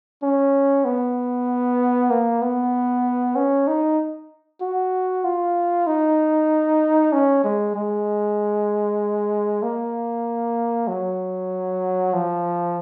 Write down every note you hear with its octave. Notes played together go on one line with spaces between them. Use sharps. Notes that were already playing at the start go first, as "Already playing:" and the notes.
C#4
B3
A#3
B3
C#4
D#4
F#4
F4
D#4
C#4
G#3
G#3
A#3
F#3
F3